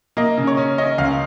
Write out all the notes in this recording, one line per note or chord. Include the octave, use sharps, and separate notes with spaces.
A#3 D#5
C#3
C#5
C#4
C#4 D#5
C#2 F5